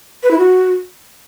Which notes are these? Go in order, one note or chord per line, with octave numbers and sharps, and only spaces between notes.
B4
E4
F#4